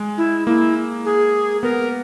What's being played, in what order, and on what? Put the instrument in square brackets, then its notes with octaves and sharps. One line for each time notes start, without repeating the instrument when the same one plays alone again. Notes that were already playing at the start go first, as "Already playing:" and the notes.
Already playing: [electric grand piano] G#3
[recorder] E4
[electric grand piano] A#3 [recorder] E4
[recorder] G#4
[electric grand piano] B3 [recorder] A#4